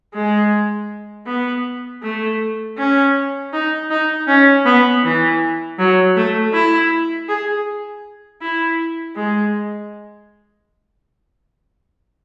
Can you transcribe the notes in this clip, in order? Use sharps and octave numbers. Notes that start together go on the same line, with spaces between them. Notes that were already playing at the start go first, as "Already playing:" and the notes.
G#3
B3
A3
C#4
D#4
D#4
C#4
B3
E3
F#3
A3
E4
G#4
E4
G#3